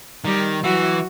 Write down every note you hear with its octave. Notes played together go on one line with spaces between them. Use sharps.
D#3 G3 G4
E3 F#3 F#4